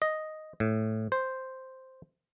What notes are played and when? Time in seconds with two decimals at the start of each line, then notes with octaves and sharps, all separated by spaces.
0.02 D#5
0.60 A2
1.12 C5